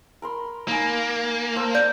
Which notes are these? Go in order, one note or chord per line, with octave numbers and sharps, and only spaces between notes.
A#4 B5 C6
A#3 D#4 G#5
A4 C5 F5
D5 G6